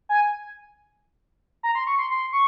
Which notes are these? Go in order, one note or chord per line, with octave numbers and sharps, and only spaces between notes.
G#5
A#5
C6
C#6
C6
C6
C#6